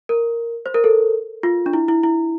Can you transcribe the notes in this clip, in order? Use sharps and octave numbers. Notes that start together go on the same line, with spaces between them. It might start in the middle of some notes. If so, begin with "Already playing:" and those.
A#4
C5
A#4
A4
F4
D4
E4
E4
E4